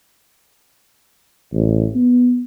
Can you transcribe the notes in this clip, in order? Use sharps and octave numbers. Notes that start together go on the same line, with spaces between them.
A1
B3